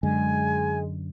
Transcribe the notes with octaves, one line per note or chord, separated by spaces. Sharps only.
F#2 D3 G#3 G#5